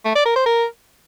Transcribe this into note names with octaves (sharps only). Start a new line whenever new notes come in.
A3
D5
A#4
C5
A#4